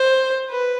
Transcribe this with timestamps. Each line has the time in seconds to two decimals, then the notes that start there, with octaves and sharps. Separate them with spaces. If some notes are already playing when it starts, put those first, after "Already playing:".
Already playing: C5
0.49 B4